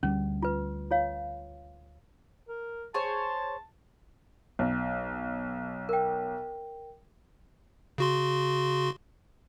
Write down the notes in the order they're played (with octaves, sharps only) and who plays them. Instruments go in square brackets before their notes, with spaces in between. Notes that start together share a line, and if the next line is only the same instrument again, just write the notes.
[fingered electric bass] D2 G3 [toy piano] C#4
[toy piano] F4 B4
F4 C#5 F5
[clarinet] A#4
[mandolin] G#4 C5 C#5 [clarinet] A5
[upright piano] B1
[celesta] A#4 G5
[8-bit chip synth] C#3 F#4 C6